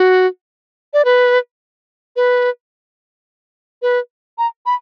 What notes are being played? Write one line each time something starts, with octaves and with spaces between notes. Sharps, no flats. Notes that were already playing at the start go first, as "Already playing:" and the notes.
Already playing: F#4
D5
B4
B4
B4
A#5
B5